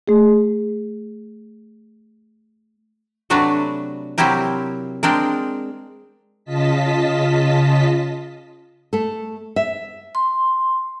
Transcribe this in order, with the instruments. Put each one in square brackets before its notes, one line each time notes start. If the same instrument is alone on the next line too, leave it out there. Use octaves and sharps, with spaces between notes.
[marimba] A3 G#4
[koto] C3 F#3 A3 D4 F#4 B4
C3 F#3 C4 E4 G4 A#4
G#3 C4 D4 A#4
[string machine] C#3 F4 D#5 A5 B6
[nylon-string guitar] A3 A4
E5
[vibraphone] C6